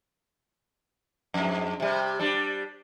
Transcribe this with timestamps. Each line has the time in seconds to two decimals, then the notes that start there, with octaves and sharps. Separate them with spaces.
1.34 F2 G#2
1.80 C3 G3
2.20 G3 D4